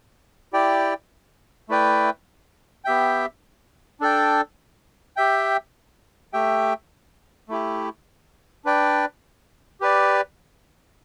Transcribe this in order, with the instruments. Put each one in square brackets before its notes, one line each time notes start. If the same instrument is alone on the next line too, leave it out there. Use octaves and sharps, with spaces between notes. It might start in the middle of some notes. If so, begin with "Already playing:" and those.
[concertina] E4 G4 D5 G5
A3 E4 B4 D5 G5
B3 G4 E5 G5
D4 A4 D5 G5
G4 E5 G5
A3 G4 E5 G5
A3 E4 G4
D4 B4 D5 G5
G4 B4 D5